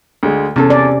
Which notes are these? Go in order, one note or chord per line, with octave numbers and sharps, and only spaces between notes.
D2 G#3
E2 C3 C#4 A4
D5